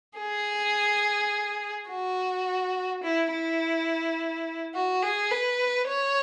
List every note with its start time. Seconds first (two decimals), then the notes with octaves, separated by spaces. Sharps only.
0.19 G#4
1.90 F#4
3.03 E4
3.32 E4
4.75 F#4
5.03 G#4
5.31 B4
5.88 C#5